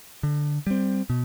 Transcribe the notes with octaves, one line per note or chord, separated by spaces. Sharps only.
D3
G3 C4
B2